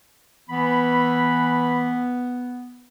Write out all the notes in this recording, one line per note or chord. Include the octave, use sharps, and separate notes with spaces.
E3 B3 B5